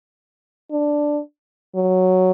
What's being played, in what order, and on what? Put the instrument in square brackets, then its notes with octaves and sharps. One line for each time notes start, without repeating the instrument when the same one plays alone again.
[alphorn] D4
F#3